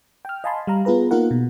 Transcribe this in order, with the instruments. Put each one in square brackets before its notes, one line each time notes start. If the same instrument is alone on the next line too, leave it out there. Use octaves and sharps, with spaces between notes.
[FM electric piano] G5 F6
D#5 F5 G#5 A5 B5 C6
G3 F5 A#5
B3 F4 G#4 B4 A#5
A#3 D#4 F4 A#4 F#5
B2